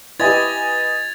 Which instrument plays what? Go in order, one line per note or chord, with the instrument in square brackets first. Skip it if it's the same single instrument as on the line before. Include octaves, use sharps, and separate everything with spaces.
[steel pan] E4 G4 [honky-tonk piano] B4 D#5 G#5 [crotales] G#6 A6 F7